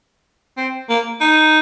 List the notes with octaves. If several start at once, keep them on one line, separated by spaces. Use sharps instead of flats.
C4
A#3
D#4